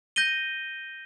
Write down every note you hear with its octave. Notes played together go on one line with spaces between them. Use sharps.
G6 A#6 D#7 G7